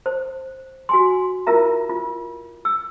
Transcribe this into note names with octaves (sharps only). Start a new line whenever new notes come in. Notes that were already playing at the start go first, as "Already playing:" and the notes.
C5
F#4 G#5 C6
E4 F4 A#4 E5 A#5
F4
E6